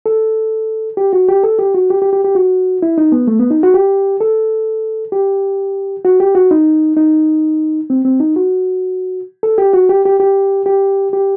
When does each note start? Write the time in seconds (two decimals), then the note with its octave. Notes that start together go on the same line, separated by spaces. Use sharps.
0.06 A4
0.97 G4
1.13 F#4
1.29 G4
1.44 A4
1.59 G4
1.74 F#4
1.90 G4
2.02 G4
2.13 G4
2.24 G4
2.35 F#4
2.82 E4
2.98 D#4
3.12 B3
3.27 A3
3.39 B3
3.50 D#4
3.63 F#4
3.74 G4
4.21 A4
5.12 G4
6.05 F#4
6.20 G4
6.35 F#4
6.51 D#4
6.96 D#4
7.90 C4
8.05 C4
8.20 D#4
8.36 F#4
9.43 A4
9.58 G4
9.74 F#4
9.89 G4
10.05 G4
10.20 G4
10.66 G4
11.13 G4